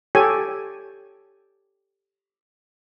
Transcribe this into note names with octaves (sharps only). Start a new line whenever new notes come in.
G4 A4 C#5 G#5